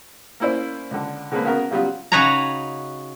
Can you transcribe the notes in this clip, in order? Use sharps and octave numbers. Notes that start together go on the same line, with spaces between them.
A#3 C#4 E4 C5 D5
C#2 D3
D3 G#3 A#3 C4 B4
C#3 B3 F#4 A#4
C#3 F#3 G3 B3 F4
C#3 D#4 F#4 B4 C#5 A#5